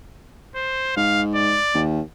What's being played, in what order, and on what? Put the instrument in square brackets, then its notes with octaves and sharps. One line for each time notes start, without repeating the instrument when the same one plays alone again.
[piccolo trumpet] C5
[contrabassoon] G#2 [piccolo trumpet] F5
[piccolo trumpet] D5
[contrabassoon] D#2